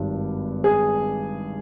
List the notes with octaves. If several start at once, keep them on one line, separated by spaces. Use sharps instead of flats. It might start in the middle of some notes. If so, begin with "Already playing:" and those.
Already playing: G#1 G2 D#3 G3
G#4